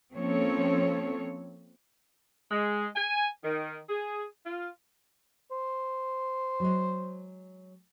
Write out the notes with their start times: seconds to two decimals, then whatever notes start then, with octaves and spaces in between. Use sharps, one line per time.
0.14 F3 A#3 C4 C#4 A4 C#5
2.51 G#3
2.96 G#5
3.44 D#3
3.89 G#4
4.45 F4
5.51 C5
6.60 F#3 G#3